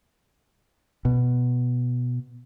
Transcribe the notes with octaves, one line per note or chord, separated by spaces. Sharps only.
B2